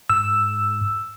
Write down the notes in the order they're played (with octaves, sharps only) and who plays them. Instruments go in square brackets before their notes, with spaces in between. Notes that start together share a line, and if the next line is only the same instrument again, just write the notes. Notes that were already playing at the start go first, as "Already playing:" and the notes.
[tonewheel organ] G#2 [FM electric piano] E6